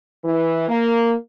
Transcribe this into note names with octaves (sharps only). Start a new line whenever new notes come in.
E3
A#3